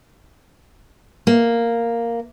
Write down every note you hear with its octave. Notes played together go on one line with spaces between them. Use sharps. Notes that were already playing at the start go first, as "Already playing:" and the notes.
A#3